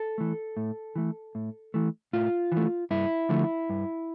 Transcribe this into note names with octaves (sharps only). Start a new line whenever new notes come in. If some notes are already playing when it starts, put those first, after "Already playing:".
Already playing: A4
E3 A3
A2
E3 A3
A2
E3 A3
A2 F4
E3
A3
G2 E4
D3 F3 A3
G2